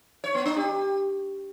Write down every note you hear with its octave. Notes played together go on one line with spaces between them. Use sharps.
C#5
B3
D4
G4